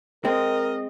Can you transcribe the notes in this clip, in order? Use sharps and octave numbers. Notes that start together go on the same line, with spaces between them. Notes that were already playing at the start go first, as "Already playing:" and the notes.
G#3 C4 A#4 D#5